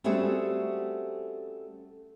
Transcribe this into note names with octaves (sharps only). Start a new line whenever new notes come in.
G3 A3 C4 C#4 F#4 G#4